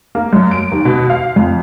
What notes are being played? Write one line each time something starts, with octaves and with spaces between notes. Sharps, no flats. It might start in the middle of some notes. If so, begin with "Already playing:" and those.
A#3
F#2
D7
D#2
B2
F5
F2